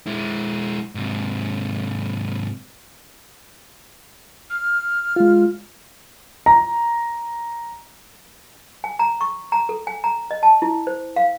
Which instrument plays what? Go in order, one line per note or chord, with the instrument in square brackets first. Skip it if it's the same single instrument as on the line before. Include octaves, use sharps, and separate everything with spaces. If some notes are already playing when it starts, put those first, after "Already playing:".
[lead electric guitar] G#3 E4
G#2 C3
[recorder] F6
[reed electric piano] G#3 F4
[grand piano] A#5
[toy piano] G#5
A#5
C#6
A#5
A4
G#5
A#5
D#5
A5
E4
C5
F5